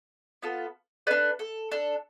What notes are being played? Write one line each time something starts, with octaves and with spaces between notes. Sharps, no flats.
B3 F4 A4
D4 A4 B4 D5
A4
D4 A4